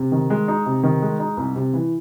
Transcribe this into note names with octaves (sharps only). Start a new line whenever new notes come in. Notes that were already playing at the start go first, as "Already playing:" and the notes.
Already playing: C3
D#3
G#3
D#4
C3
D#3
G#3
D#4
C2
C3
E3